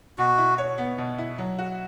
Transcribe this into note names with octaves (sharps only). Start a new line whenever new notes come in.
B2 F#4
E4
C#5
B3
B2
E4
F#3
F#4